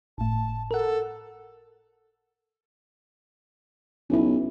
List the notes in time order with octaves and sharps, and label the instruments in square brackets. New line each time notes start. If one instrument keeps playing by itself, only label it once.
[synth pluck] G1 A2 [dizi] A5
[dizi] A4 [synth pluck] A#4 F#5
[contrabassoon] B1 [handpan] C#4 E4